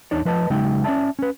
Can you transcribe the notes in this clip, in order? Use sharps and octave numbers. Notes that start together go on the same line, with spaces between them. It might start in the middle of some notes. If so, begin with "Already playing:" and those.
E2 D4 D#4 C#5 D5
F3 B4 D#5 A5
C#3 F#3 G#3 D#4 G5
C#4 F4 D5 E5 A5
C#4 B4